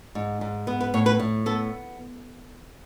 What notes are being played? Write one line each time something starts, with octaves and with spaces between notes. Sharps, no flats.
G#2
G#2
B3
B4
A2 C#5
B4
A2
B3 A4